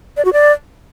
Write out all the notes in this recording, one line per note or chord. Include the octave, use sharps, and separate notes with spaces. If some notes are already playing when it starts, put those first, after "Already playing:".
D5
F#4
D5